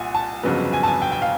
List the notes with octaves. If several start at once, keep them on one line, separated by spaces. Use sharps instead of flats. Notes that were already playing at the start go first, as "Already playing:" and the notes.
Already playing: C2 A#2 F#5 G#5
A5
G1 F2 C#3 F#3 B3
G#5
A5
G#5
G5
G5
F5